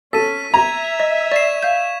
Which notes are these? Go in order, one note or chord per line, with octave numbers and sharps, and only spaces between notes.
C#4 A4 B6 D#7
E5 A#5 G#6 F7
D#5
D5 C#6 C7 E7
F5 G6